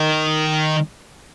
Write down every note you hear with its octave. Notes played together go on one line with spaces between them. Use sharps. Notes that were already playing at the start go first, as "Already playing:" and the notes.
Already playing: D#3